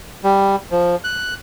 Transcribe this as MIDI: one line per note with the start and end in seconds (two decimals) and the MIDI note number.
0.24 0.56 55
0.71 0.96 53
1.04 1.34 90